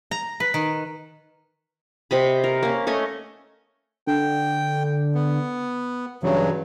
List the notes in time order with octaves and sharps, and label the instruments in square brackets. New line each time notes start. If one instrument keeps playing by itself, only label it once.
[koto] A#5
B4
D#3
[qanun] C3 D#5 B5
A#4
A#3 C#4
A3 C#4 D#5 G#5
[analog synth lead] D3 [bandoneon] G5
[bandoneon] B3
[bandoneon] G2 C#3 F#3 [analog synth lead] E3